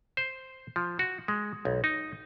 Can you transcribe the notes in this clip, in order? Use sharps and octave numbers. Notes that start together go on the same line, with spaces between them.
C5
F3
F#4
G#3
B1
D#4